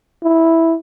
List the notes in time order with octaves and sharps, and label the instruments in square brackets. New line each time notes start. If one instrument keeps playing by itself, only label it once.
[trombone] E4